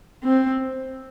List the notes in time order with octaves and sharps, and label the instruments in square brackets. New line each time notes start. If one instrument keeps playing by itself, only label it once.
[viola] C4